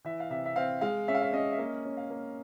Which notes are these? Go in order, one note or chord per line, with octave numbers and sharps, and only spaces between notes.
E3 E5
F5
C3 E5
E5
C4 F5
G#3 F5
C#4 E5
F5
E5
C#4 D#5
E5
A#3 D#5
C#4
F5
A#3